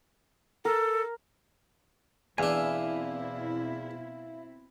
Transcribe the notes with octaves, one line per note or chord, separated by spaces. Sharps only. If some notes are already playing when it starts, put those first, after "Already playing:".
A4 A#4
E2 B2 C4 D4 E4 E5 F5 G#5